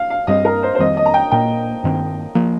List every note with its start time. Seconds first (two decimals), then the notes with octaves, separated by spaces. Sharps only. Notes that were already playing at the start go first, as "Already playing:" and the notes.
Already playing: F5
0.10 F5
0.27 G2 G3 C4 D#5
0.45 A#4
0.63 C5
0.75 C5
0.79 F2 D#3 G3 C4 D#5
0.97 D#5
1.06 A#5
1.14 G5
1.31 A#2 A#3 G5
1.84 G2 D#3 C4
2.35 F3 A#3